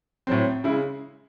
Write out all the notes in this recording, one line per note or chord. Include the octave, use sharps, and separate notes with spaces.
A2 F#3 C4
C#3 G#3 E4